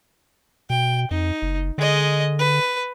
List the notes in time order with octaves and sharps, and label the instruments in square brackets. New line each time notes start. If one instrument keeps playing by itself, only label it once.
[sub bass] B2 [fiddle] G5
[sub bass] F2 [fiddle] D#4
[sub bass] F#1
[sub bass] D3 [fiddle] G#3 D#5
[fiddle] B4